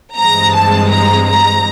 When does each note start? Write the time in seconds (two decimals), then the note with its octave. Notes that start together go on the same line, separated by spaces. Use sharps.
0.17 G2 E3 G#3 C4 A#5
0.54 A5
0.91 A#5
1.28 A#5